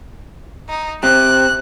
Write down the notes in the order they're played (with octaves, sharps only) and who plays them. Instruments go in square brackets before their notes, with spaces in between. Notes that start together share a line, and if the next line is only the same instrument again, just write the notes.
[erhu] D#4
[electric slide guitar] C4 G4 [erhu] F#6